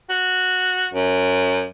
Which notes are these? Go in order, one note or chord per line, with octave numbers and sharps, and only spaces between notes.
F#4
F#2